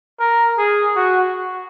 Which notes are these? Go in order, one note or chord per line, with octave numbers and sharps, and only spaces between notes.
A#4
G#4
F#4